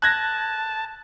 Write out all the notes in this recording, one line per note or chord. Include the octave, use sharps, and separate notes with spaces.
A5 F#6 G#6 A#6